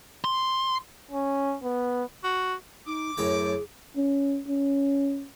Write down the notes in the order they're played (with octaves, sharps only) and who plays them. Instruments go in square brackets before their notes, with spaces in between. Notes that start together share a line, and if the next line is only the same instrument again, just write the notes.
[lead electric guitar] C6
[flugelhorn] C#4
B3
[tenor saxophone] F#4
[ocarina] D#4 [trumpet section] D6
[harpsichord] F#2 A2 G5 [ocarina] G#4
[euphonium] C#4
C#4